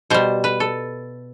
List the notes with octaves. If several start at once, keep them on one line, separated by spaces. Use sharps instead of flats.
B2 G3 C5
B4
A4